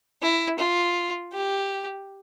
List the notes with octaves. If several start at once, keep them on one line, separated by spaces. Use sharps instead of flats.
E4
F4
G4